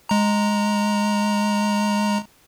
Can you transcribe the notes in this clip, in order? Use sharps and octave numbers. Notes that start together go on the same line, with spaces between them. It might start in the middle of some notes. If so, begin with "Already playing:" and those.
G#3 A#5